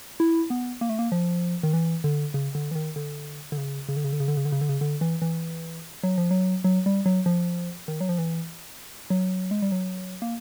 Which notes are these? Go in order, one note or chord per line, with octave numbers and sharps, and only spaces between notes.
E4
B3
A#3
A3
A#3
F3
D#3
E3
D3
C#3
D3
E3
D#3
D3
D3
C#3
C#3
D3
C#3
D3
C#3
D3
C#3
D3
C#3
D3
C#3
D3
E3
E3
F#3
F3
F#3
F#3
G3
F#3
F3
D#3
F#3
F3
E3
F#3
G#3
G3
F#3
A#3